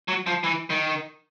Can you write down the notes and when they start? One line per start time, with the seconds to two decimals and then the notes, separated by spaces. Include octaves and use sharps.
0.08 F#3
0.26 F3
0.44 E3
0.70 D#3